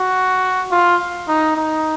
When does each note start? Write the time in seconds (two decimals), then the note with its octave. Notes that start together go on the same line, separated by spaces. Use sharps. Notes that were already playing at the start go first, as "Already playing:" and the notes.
Already playing: F#4
0.72 F4
1.29 D#4
1.57 D#4